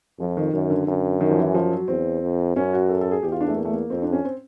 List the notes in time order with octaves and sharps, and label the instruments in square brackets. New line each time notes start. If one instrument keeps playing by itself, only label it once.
[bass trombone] F2 [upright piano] F3
[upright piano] D#3
[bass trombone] F#2 [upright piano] D#3
[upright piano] D3
[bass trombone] F#2 [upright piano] D3
[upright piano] D#3
F3
E3
F3
F#3
[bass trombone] E2 [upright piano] C4
[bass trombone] F2
[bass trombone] F#2 [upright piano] C#4
[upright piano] F#4
A4
A4
G#4
[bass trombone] E2 [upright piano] G4
[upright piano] F4
D4
A3
A#3
A3
A#3
[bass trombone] F2 [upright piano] C4
[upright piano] D4
C#4
C4